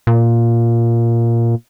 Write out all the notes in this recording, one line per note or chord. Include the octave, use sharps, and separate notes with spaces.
A#2